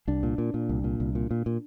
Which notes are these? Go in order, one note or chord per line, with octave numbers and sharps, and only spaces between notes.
C2 D4
A#2
A#2
A#2
C2
A#2
C2
A#2
A#2
A#2